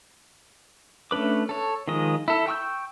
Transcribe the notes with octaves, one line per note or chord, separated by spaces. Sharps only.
A3 C#4 D4 B4 D6
A4 C#5
D#3 F3 G#3 D#5
E4 A4
G5 C#6 E6 F6 G6